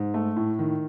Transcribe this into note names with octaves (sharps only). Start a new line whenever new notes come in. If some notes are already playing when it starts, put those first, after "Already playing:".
Already playing: G#2
A3
A2
D#3